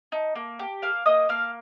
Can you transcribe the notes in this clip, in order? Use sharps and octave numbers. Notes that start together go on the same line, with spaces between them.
D#4
A#3
G4
A#3 F5 F6
A#3 D#5 D#6
A#3 F5 F6